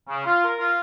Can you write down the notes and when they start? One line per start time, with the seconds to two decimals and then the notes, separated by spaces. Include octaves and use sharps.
0.08 C#3
0.25 F4
0.43 A#4
0.59 F4